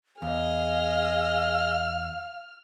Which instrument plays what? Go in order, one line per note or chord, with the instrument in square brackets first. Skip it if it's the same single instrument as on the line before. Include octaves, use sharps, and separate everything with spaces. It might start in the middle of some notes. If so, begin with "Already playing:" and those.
[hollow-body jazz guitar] E2 [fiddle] G#4 D#5 [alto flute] F5 [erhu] F6